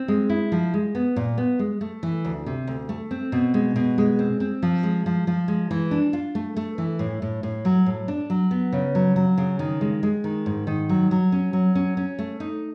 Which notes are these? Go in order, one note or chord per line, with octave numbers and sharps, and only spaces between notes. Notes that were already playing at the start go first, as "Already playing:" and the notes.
Already playing: C4
G#3
E4
F3
G#3
B3
A#2
B3
G#3
A3
E3
D2
C3
D2
A3
C4
B2
G#3
B2
G#3
C4
C4
F3
G#3
F3
F3
G#3
E3
D4
F4
A3
A3
E3
A2
A2
A2
F#3
A2
D4
F#3
B3
C#3
F#3
F#3
C#3
D#3
G#3
G#3
D#3
G#2
D#3
F#3
F#3
C#4
F#3
C#4
C#4
A3
D#4